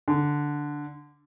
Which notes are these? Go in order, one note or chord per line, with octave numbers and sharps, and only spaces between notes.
D3